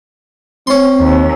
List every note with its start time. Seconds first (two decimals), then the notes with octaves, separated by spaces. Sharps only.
0.67 C4 C#4 C6
1.00 D#2